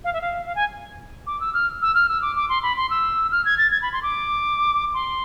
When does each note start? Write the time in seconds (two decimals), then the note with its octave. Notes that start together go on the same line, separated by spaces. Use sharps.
0.04 F5
0.13 E5
0.21 F5
0.46 F5
0.55 G#5
1.27 D6
1.41 E6
1.54 F6
1.82 E6
1.95 F6
2.09 E6
2.22 D6
2.36 D6
2.49 C6
2.63 B5
2.77 C6
2.90 E6
3.32 F6
3.45 G#6
3.58 A6
3.71 G#6
3.82 B5
3.93 C6
4.03 D6
4.94 C6